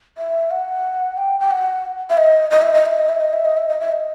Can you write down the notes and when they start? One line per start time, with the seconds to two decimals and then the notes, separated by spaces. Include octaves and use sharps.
0.18 E5
0.51 F#5
1.17 G5
1.40 G5
1.51 F#5
2.10 E5
2.17 D#5
2.51 D#5
2.62 E5
2.74 D#5
2.86 E5
2.98 D#5
3.09 E5
3.21 D#5
3.33 E5
3.45 D#5
3.57 E5
3.69 D#5
3.80 E5
3.92 D#5